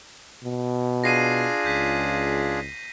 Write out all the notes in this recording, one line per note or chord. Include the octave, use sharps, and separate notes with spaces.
B2
D4 F4 G#4 A#6 C7 D#7
C#2 G6 B6